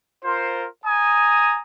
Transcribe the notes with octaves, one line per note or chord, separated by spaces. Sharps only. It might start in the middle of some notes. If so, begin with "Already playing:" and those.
F4 A#4 C5
G#5 A#5 D#6